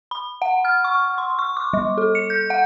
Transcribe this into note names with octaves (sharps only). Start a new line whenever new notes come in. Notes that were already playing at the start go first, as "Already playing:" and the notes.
B5
F#5
F6
C#6
C6
C#6
D6
G3
A4
C#7
G6
F#5